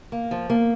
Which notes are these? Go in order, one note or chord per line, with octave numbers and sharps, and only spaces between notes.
A#3
F3
A#3